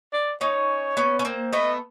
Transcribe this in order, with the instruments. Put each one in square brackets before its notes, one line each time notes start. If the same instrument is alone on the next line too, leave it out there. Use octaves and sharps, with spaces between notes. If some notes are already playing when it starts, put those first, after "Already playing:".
[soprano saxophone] D5
[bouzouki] C#4 D#4 [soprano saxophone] C#5
[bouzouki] B3 C#4
C#4
A#3 C4
[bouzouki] A3 B3 [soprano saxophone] D#5